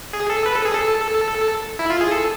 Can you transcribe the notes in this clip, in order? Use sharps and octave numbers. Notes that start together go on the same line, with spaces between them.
G#4
A4
B4
A4
G#4
A4
E4
F4
G#4
A4